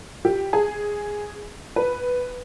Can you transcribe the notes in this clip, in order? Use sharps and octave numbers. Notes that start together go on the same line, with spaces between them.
G4
G#4
B4